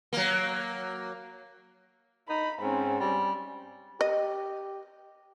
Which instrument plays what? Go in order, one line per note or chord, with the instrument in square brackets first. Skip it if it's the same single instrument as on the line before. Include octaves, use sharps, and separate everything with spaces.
[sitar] F#3 A#3
[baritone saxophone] D#4 [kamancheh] B5
[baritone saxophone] G#2 [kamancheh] C4 C#4
[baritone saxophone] G3
[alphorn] G4 [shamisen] D#5